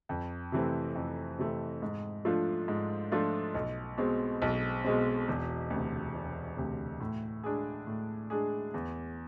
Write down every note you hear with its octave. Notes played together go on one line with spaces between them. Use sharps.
F2
C3 E3 A3 C4
F2
C3 E3 A3 C4
G#2
F3 A3 D4 F4
G#2
F3 A3 D4 F4
B1
B2 G#3 C4
B1
B2 G#3 C4
E1
D2 C3
E1
D2 C3
A2
G#3 D4 G#4
A2
G#3 D4 G#4
E2